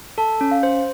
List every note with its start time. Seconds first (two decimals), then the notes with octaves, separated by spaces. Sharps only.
0.18 A4 A5
0.41 C#4
0.51 F5
0.63 C5